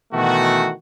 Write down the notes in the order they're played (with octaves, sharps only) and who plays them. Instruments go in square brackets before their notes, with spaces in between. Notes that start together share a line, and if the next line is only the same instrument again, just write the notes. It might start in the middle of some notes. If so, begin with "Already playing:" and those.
[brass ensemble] B2 D#3 E3 A3 F#4